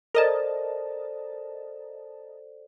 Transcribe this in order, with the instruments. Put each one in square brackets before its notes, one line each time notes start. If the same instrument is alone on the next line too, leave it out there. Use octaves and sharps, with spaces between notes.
[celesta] A4 C5 D5 [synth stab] A#4 D#5 A5